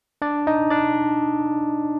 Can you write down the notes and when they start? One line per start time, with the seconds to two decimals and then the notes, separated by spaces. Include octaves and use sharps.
0.22 D4 D5
0.47 D#4 D#5
0.70 D4 D5